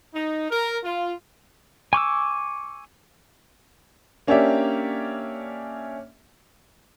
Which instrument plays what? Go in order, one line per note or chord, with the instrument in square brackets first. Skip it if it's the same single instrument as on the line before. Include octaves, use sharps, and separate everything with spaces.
[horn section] D#4
A#4
F4
[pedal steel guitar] G#5 C#6 D6 E6
[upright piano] A#3 C#4 D4 G4 D5 E5